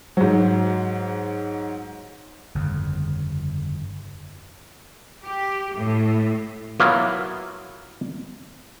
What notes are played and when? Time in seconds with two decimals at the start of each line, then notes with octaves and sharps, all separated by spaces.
0.17 G#2 F#3
2.55 G1 F2 C#3
5.22 G4
5.74 A2
6.80 F#3 A#3 B3 E4 F4